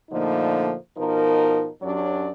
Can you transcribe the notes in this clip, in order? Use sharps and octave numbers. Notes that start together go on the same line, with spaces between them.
A#2 D3 F3 A3 A#3 D#4
B2 F3 D#4 A#4
F#2 F#3 C#4 D4 G4 D5